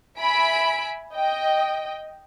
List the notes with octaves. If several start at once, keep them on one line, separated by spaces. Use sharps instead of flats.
E5 G#5 B5 B6 D7
D#5 G5